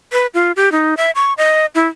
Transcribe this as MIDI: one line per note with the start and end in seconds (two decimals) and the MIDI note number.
0.12 0.27 71
0.34 0.52 65
0.56 0.72 67
0.72 0.97 63
0.97 1.11 76
1.15 1.33 85
1.38 1.66 75
1.75 1.87 64